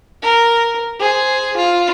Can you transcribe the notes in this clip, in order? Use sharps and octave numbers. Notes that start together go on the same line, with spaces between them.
A#4
G#4 C5
F4